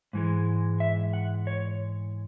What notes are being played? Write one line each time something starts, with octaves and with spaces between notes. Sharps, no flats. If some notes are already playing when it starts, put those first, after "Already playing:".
G#2 E3 G#3
E5
F#5
C#5